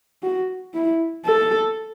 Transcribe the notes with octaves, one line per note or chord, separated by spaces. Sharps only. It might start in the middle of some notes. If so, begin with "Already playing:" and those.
F#4
E4
A4